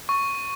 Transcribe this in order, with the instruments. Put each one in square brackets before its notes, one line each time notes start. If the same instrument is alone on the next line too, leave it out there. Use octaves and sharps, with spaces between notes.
[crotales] C#6